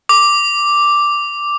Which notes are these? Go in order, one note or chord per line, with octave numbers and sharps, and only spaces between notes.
D6